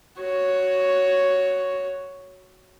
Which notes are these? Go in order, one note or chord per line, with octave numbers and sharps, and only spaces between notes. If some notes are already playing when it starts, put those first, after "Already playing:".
F#4 C#5